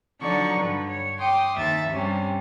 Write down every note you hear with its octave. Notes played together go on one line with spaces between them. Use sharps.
D3 F3 F#3 D#4 D5 C#6
G2 D3 B4
C#5
G5 C6 D6 D#6
D#2 E5 A6
G2 C3 G3 C#4